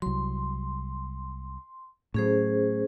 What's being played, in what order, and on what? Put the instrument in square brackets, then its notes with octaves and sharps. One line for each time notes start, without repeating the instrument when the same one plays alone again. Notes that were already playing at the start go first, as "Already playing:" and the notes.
[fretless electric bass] C2 F#3 [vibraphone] C6
[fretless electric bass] A2 F#3 [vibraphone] C#4 G#4 C5